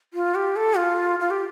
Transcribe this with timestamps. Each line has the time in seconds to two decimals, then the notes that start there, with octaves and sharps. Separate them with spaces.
0.14 F4
0.35 G4
0.56 A4
0.77 F4
1.20 F4
1.31 G4